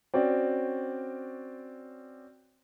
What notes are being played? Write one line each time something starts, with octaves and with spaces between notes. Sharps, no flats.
C4 C#4 F#4 D5